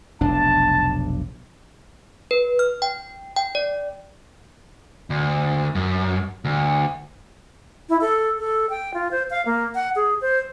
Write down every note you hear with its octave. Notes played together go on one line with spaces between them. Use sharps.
F1 B1 D4 A5
B4
F6
G5
G5
D5
D2
F#2
D2
E4
A4
A4
G5
F4
C5
F5
A#3
F#5
G#4
C5